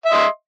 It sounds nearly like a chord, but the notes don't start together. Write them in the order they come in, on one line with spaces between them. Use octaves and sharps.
E5 D#5 C6